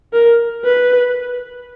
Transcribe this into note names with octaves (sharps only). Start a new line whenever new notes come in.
A#4
B4